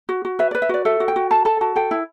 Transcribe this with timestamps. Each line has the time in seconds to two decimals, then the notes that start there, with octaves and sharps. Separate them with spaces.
0.09 F#4
0.25 F#4
0.39 B4 E5
0.51 B4 D5
0.62 E5
0.69 F#4 D5
0.85 A4 E5
1.00 F#4
1.08 G5
1.16 F#4
1.31 A4 A5
1.45 A4 A5
1.61 F#4 A5
1.76 A4 G5
1.91 E4